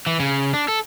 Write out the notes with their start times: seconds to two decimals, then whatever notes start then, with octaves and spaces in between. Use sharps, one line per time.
0.07 E3
0.20 C#3
0.54 D4
0.68 A4